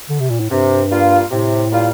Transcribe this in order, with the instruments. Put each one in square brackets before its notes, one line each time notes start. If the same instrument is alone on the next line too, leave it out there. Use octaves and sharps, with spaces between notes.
[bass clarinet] D3
C3
A#2
A2
[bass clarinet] G2 [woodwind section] C3
[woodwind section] G3 A#3 F4
[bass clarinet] A2 [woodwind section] C3
[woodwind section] G3 A#3 F4